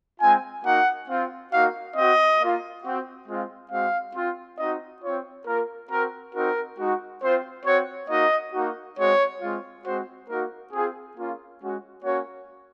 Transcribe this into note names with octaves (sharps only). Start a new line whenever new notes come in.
G#3 C4 F4 G#5
A#3 D#4 F#4 F#5
C4 F4
A#3 D#4 F#4 F5
C4 F#4 D#5
A#3 F4
C4 F#4
G#3 C4 F4
G#3 C4 F#4 F5
C4 F4
C4 D#4 F#4 D#5
C4 F4 C#5
A#3 F4 A#4
C4 F#4 A#4
C4 D#4 F#4 A#4
G#3 D#4 F#4
C4 F4 C5
C4 F#4 C#5
A#3 D#4 F#4 D#5
A#3 D#4 F#4
G#3 C4 F#4 C#5
G#3 C4 F4
G#3 C4 F#4 C5
A#3 D#4 F#4 A#4
C4 F4 G#4
A#3 C#4 F4
G#3 C#4 F#4
A#3 C#4 F#4 C#5